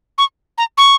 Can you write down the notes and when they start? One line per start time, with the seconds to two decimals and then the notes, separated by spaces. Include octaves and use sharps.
0.18 C#6
0.58 A#5
0.78 C#6